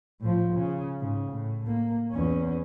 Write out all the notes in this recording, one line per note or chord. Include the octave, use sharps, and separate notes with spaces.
A2 F3
C#3
G#2 C#3
A2
A#3
E2 C#4